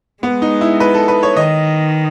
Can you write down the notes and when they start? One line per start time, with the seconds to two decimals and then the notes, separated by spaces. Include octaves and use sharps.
0.23 G#3 B3
0.42 D#4
0.61 E4
0.80 B4
0.94 A4
1.08 B4
1.23 C#5
1.37 D#3 D#5